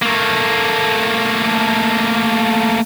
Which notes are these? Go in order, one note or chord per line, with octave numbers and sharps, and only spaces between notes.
A3 A#3